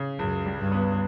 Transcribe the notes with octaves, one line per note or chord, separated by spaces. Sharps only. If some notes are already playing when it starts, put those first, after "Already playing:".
Already playing: C#3
C#2 F#2
G3
G2
B3